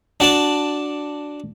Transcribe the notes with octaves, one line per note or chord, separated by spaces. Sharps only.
D4 F#4 D5 A5